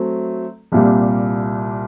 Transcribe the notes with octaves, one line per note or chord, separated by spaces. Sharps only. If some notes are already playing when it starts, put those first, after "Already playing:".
Already playing: F#3 A3 C4
C2 A#2 G3